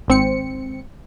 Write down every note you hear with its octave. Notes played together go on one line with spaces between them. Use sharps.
G#1 C4 C#7